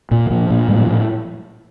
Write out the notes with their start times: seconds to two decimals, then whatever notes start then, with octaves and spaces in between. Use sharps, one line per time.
0.11 A#2
0.26 E3
0.30 A#2 F3
0.50 A#2
0.68 A2 G3
0.78 F#3
0.87 A2 F3